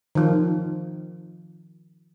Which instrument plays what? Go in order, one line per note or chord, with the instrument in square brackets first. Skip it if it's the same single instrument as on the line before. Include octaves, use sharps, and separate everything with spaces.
[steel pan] D#3 F3